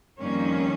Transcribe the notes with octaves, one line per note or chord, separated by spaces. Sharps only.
F2 D#3 G3 A#3 C#4